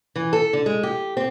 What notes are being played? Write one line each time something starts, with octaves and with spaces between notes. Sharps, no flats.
E3
A4
D3
G#3
G4
C4